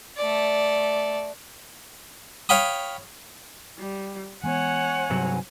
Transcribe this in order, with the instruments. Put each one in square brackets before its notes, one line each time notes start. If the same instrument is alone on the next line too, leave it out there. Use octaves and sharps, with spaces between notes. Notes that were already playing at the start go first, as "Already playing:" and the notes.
[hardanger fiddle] A3 D5
[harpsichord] C#5 F5 G5 B5 D#6
[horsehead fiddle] G3
[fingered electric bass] E3 G#3 B3 [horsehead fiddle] C#5 F#5 [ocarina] G#5
[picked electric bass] G2 C3 F#3